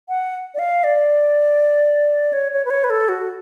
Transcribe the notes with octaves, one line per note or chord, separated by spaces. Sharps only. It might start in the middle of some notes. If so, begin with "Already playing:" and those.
F#5
D5
F5
D5
C#5
C#5
B4
C#5
B4
A4
F#4